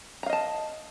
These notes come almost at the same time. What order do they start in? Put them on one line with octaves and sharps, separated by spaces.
A#5 F5 D#5 A5